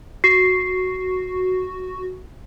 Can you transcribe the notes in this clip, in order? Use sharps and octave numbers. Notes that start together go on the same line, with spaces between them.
F#4 C7